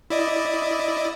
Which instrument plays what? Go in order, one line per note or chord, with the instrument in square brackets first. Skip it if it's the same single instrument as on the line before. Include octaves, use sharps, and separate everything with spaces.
[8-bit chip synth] E4 D5 D#5